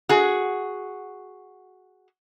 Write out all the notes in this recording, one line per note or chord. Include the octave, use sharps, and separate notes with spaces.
F#4 G#4